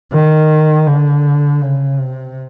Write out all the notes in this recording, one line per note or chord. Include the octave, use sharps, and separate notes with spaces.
D#3
D3
C#3
C3